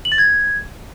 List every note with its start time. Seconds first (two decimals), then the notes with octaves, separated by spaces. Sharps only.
0.05 F#7
0.12 A6
0.18 G#6